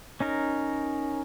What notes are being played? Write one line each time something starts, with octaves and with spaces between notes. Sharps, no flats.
C#4 D#4 A#4